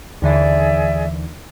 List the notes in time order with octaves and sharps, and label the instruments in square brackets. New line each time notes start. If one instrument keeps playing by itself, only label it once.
[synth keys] D#2 D3 E3 [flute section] G#4 D5 E5